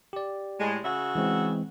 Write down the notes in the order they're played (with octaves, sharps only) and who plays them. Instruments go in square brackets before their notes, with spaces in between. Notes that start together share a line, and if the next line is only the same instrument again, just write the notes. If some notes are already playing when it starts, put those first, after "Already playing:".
[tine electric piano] G4 D5
[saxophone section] A2 G#3
C#3 F#4 E5
[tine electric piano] E3 G#3 C4